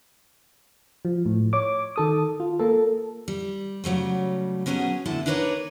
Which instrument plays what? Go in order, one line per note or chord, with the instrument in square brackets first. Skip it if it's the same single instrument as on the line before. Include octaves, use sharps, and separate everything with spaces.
[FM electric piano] F3
A2
C#5 D6
D#3 A4 D#6
F4
A#3 A4
[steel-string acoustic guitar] G3
C#3 F#3 G3 A3
B2 F#3 C#4 G#4 D#5
E2 A2 D3 E4 A4 A5
D4 D#4 A#4 B4 C#5 D5